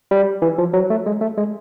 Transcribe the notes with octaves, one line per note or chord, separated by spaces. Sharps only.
G3
E3
F3
F#3
A3
G#3
A3
G#3